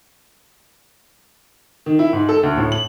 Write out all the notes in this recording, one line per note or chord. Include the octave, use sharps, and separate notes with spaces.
D#3
E4
G#2
A4
D2
A2
F#7